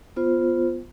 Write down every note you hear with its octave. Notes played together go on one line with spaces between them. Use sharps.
B3 F4 C5